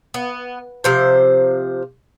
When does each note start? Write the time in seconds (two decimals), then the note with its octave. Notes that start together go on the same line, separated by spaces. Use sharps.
0.14 B3
0.84 C3 F3 C5